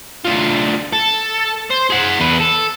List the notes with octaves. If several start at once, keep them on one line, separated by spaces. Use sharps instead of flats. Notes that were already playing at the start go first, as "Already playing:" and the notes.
D2 F4
A4
C5
G#4 F#5
E2 B4
A4